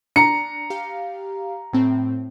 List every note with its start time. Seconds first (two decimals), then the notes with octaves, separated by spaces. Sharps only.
0.16 D4 A#5 C#7
0.70 G4 F5
1.73 A2 C4